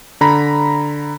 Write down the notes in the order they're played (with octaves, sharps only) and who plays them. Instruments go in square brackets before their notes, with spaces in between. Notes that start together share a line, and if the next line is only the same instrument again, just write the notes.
[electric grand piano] D3 A#5 B5